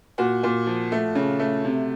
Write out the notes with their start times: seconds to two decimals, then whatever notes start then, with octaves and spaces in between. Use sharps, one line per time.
0.18 A#2 F#4
0.43 A#2
0.67 F3
0.92 A3
1.15 C#3
1.39 A3
1.65 C3